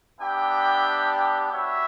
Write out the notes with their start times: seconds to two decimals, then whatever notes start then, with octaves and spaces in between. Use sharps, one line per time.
0.19 B3 D4 G4 E5 G5
1.51 B3 F#4 C#5 E5